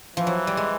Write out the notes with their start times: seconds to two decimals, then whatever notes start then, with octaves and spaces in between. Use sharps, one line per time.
0.16 E3 F3
0.27 F#3
0.47 G3
0.57 G#3